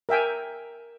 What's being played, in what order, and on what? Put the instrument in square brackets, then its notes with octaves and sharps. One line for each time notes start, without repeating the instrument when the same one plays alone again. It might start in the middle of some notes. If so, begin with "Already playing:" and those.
[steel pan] A#4 E5 G5 G#5